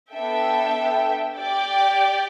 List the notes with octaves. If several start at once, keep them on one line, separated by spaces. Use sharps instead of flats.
B3 D4 A4 E5 G5
G4 D5 G5